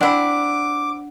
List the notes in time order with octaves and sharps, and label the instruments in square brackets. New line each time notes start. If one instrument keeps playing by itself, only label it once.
[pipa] C4 E4 [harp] D4 F#5 [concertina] D6